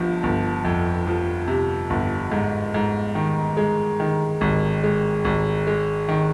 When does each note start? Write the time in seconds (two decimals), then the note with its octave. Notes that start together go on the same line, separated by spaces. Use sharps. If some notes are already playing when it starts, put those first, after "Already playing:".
Already playing: G1 F3
0.23 G1
0.64 F2
1.07 F3
1.48 C3
1.90 G1
2.32 G#2
2.74 G#2
3.15 D#3
3.57 G#3
4.00 D#3
4.41 G#1
4.84 G#3
5.25 G#1
5.67 G#3
6.09 D#3